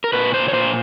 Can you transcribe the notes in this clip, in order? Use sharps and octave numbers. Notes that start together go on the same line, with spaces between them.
A#4
A#2 B4
C5
C#5
A#2 C5